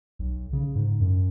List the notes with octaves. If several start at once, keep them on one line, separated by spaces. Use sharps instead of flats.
B1
C#3
G#2
F#2